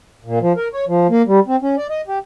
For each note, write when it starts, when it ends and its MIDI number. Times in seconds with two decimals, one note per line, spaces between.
0.25 0.39 46
0.41 0.53 53
0.56 0.68 70
0.73 0.85 73
0.87 1.07 53
1.10 1.22 58
1.27 1.40 55
1.47 1.56 60
1.62 1.76 61
1.77 1.87 74
1.90 2.01 75
2.08 2.19 67